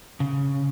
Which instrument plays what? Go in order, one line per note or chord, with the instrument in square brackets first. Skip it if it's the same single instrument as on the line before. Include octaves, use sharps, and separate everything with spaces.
[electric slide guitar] C#3